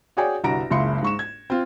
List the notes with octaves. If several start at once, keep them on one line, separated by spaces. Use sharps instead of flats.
F#4 G#4 C#5 D5 G5 G#5
G1 C2 F#4 A#5 A#6 D7
F#1 C#2 E4 C6 C#7
G#2 C#6 E7
G#6
C4 F4